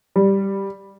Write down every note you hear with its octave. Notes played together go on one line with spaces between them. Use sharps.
G3